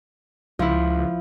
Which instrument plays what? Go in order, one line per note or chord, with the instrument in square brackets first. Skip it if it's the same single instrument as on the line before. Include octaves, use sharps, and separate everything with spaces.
[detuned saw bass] C#2 [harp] F3 E4